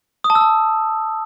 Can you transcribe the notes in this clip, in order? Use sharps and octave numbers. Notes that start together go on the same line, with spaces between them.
D#6
A5
E6
A5